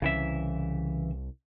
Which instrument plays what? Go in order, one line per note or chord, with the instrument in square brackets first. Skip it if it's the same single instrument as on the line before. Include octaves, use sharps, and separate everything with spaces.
[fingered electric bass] C2 [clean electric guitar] C#3 E3 E5